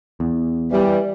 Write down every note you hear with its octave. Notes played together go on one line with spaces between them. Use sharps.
E2
E3 G3